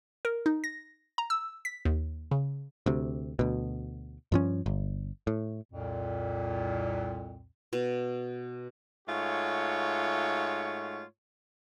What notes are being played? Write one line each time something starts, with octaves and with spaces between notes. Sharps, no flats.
A#4
D#4
A#6
A#5
E6
B6
D#2
C#3
D2 C3
D2 B2
G2 F3 C#4
G1
A2
C2 F2 A#2
B2
G#2 A3 F4 F#4 C#5